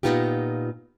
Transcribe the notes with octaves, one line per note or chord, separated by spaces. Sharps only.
A#2 F#3 B3 D#4 F4 G4